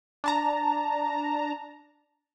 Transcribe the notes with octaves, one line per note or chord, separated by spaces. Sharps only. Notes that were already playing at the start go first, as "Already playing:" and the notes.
D4 A5 A#5